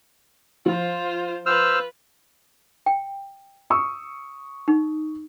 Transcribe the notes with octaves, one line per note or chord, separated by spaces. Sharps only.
F3 F4 C5
F4 B4 C5 E6 F6
G5
C#6 D#6 E6
D#4